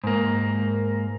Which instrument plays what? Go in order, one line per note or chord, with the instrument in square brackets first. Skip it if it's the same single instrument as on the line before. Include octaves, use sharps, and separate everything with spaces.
[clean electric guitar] G#2 A#3